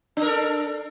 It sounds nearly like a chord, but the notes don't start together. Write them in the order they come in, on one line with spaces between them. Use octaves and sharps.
D4 A#4 A4